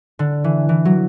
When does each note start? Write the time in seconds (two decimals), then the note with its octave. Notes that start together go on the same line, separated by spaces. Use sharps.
0.19 D3
0.44 E3
0.69 E3
0.85 F#3